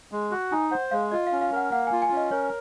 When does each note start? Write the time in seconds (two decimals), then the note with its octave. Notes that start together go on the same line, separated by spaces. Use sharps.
0.12 G#3
0.31 F#4
0.52 D#4 G#5
0.71 C5 F#5
0.91 G#3 F5
1.12 F4 D#5
1.27 F5
1.32 C#4
1.41 F5
1.52 A#4 F#5
1.72 A#3 F#5
1.87 G#5
1.92 F4
2.02 G#5
2.12 C#4
2.17 D#5
2.31 A#4 C#5